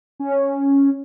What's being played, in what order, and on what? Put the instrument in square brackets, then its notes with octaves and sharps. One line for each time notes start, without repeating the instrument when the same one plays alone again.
[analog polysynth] C#4